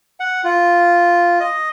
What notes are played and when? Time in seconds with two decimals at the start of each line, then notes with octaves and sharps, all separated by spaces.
0.20 F#5
0.44 F4
1.40 D#5